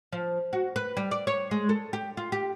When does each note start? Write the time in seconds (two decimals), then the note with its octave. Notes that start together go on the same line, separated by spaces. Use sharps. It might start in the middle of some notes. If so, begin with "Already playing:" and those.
0.12 F3
0.53 F#4
0.76 B4
0.97 G3
1.11 D5
1.27 C#5
1.51 G#3
1.69 A4
1.93 G4
2.17 F4
2.32 G4